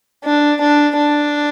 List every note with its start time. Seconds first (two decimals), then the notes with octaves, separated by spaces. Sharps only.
0.24 D4
0.61 D4
0.96 D4